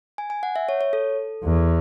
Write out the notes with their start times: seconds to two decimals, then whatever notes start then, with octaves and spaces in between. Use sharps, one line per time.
0.18 G#5
0.30 G#5
0.43 F#5
0.56 E5
0.69 C#5
0.81 C#5
0.93 A4
1.44 E2